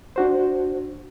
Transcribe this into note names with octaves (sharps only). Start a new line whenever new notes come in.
D4 F#4 C5